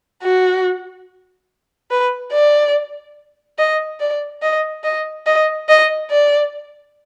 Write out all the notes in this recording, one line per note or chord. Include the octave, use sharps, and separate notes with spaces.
F#4
B4
D5
D#5
D5
D#5
D#5
D#5
D#5
D5